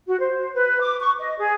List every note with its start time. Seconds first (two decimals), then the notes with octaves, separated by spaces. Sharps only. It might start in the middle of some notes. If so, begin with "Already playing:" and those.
0.07 F#4
0.19 C5
0.55 B4
0.80 D6
0.99 C#6
1.19 D#5
1.37 G#4